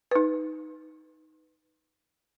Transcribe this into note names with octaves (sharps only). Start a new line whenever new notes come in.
D#4 B4